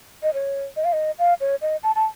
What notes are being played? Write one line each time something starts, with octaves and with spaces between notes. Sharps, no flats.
D#5
C#5
D#5
F5
D#5
F5
C#5
D#5
A5
A5